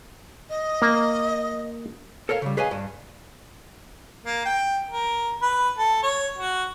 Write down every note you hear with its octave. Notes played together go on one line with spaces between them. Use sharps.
D#5
A#3
A4 A#4 C#5 F5
C#3 G3
G#4 B4 C#5 D#5 F5 G#5
G2
A#3
G5
A#4
B4
A4
C#5
F#4